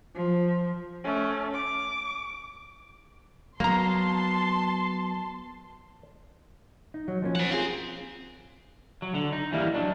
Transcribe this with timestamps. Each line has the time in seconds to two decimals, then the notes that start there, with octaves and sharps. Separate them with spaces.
0.15 F3
1.04 A3 C#4
1.53 D6
3.60 F#3 A#3 B3 A5 A#5 C6
6.94 D#4
7.08 F#3
7.22 F3 A#3 C#4
7.35 C5 F#5
7.51 C4 F4 F#4 G#4
9.02 F#3
9.15 D3
9.33 D#4
9.52 E3 G3 A#3
9.74 F#3 D4